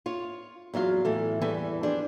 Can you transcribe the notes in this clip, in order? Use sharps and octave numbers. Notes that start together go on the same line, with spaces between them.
F4 C#5
E2 F#3 F4 F5
A2 E3 A4
E2 E3 G3 A4 G#5
F3 D4 G#4